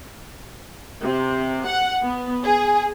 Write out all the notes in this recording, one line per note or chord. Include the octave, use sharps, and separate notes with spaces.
C3
F#5
B3
G#4